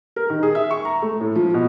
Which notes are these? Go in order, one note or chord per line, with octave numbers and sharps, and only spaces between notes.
A#4
D#3
G#4
E5
C#6
A#5
A3
A2
F3
B2